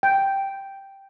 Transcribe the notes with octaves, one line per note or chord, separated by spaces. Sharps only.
G5